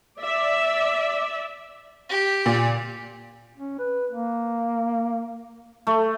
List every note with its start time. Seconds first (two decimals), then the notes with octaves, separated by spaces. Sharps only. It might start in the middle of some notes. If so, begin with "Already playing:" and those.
0.19 D5 E5
2.09 G4
2.46 A#2
3.56 C#4
3.79 B4
4.11 A#3
5.87 A3